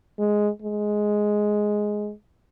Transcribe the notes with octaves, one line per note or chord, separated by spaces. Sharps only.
G#3
G#3